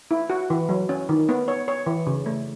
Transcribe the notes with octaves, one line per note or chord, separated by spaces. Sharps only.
E4
F#4
E3
F#3
C#4
D#3
B3
C#5
C#5
E3
C#3
A3